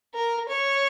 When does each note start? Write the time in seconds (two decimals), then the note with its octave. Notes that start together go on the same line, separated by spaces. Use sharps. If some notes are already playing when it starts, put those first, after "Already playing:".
0.14 A#4
0.49 C#5